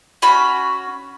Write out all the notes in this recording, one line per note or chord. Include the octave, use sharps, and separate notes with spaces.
C#4 F#4 B5